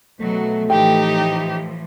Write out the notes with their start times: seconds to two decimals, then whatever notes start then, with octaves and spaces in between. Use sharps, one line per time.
0.20 B2 F#3 A3
0.70 A2 E3 F3 D#4 G4 G5